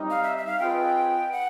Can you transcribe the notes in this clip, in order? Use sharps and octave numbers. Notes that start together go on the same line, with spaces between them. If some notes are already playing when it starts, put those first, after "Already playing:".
Already playing: G3 C4 D#4
F5
E5
E5
F5
C4 F4 G#4 B4 D#5 G5
F#5